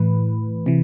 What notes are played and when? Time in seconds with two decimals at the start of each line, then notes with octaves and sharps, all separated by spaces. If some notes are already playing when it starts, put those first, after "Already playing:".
Already playing: A2 E3 B4
0.66 C3 E3